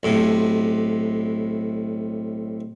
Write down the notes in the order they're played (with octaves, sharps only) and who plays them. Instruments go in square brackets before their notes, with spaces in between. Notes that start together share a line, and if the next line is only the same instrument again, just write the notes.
[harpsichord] B1 A2 C3